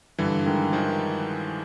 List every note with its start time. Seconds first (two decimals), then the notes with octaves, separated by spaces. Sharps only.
0.18 G2 D3 E3
0.46 D#3 G#3
0.73 D#3 F3